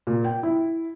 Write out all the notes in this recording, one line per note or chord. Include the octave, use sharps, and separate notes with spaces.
A#2
G5
E4